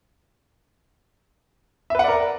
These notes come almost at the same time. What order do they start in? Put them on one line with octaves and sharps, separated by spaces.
E5 B4 F#5 D5 A#4